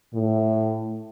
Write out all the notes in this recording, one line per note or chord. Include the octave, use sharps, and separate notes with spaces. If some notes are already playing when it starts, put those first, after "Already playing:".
A2